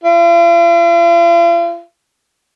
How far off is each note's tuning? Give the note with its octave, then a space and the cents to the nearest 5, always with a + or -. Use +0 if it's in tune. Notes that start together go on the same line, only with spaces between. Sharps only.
F4 -45